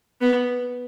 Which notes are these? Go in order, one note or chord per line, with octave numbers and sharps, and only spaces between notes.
B3